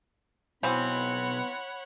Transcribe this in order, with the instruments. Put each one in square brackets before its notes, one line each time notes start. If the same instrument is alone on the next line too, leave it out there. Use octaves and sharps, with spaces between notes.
[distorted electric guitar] B1 [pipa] E3 C4 [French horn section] B3 [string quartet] C#5 F#5 B5